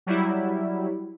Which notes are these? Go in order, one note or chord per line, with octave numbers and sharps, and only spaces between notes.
F#3 G3 E4